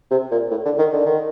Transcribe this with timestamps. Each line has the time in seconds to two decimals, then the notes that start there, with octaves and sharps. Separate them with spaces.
0.11 C3
0.31 A#2
0.51 A2
0.65 D3
0.79 D#3
0.93 D3
1.06 D#3